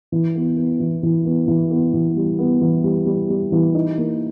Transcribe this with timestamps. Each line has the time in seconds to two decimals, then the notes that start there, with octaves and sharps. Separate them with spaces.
0.12 E3
0.35 B3
0.57 B3
0.80 E3
1.03 E3
1.25 B3
1.48 E3
1.71 B3
1.93 E3
2.17 G3
2.39 B3
2.61 E3
2.84 G3
3.06 G3
3.30 G3
3.52 E3
3.75 D#4
3.98 A#3